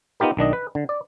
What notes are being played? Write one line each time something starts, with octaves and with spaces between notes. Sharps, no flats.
B3 D#4 F4 G4 A#4
B1 D#3 D4 D#5
B4
D3
D5